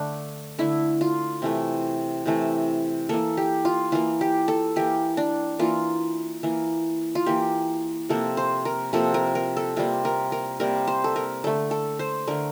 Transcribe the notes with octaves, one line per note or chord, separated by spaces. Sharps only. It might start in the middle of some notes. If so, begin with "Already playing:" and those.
Already playing: D3 A3 D4
D3 A3 E4
F4
C3 E3 A3
C3 E3 A3
E3 A#3 A4
G4
F4
E3 A#3 F4
G4
A4
E3 A#3 G4
D4
E3 A#3 F4
E3 A#3
F4
E3 A#3 G4
C3 F3 A#3 A4
C5
A#4
C3 F3 A#3 A4
A#4
A#4
A4
C3 G3 A#3 F4
A#4
A#4
C3 G3 A#3 A#4
C5
A4
A#4
D3 A3 A4
A4
C5
D3 A3 A#4